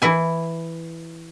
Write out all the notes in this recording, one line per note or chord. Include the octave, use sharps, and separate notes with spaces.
E3 E4 G#5